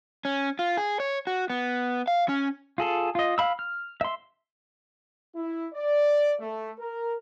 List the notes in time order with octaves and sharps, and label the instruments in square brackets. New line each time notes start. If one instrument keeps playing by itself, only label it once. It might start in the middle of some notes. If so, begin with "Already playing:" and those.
[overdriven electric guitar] C#4
F4
G#4
C#5
F#4
B3
F5
C#4
[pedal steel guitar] F4 G#4 A4
F4 D#5
F5 B5 E6
F6
E5 C6
[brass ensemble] E4
D5
A3
A#4